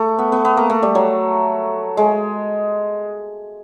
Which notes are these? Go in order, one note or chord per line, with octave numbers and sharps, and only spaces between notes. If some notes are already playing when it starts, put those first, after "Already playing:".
Already playing: A3
B3
B3
B3
A#3
A3
G3
F#3
G#3